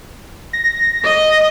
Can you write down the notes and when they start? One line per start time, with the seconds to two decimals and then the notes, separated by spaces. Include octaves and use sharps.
0.53 A#6
1.04 D#5